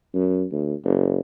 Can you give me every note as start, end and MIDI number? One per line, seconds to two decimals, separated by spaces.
0.14 0.44 42
0.52 0.74 38
0.84 1.20 30